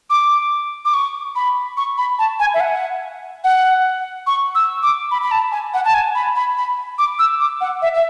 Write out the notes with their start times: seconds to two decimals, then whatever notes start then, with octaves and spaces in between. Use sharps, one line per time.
0.10 D6
0.85 D6
0.94 C#6
1.36 B5
1.77 C#6
1.98 B5
2.19 A5
2.40 G#5
2.54 E5
2.60 F#5
3.44 F#5
4.27 C#6
4.55 E6
4.83 D6
5.11 B5
5.23 B5
5.31 A5
5.52 G#5
5.74 F#5
5.85 A5
5.94 G#5
6.15 B5
6.36 B5
6.57 B5
6.98 D6
7.19 E6
7.40 D6
7.61 F#5
7.82 E5
7.94 E5